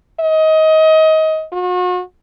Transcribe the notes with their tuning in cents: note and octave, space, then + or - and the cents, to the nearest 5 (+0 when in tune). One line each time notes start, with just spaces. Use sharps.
D#5 +25
F#4 -40